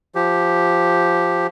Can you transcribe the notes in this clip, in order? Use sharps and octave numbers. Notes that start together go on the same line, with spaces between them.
F3 G4